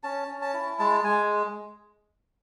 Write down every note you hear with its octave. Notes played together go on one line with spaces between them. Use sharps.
C#4 A5
C#4
A5
E4
G#3 A5
G#3 G#5